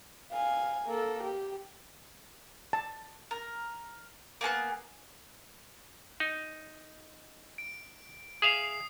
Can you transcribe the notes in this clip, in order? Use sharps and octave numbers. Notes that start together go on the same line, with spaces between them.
F5 G#5
A#3 A4
G4
A5
A#4
A#3 B3 G#4 F#5
D#4
D7
G#4 E5 F5 D#6 C7